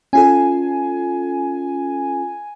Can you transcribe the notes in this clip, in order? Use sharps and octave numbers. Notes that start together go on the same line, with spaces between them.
C#4 F4 A4 G#5